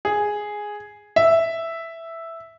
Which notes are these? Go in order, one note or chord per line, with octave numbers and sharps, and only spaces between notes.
G#4
E5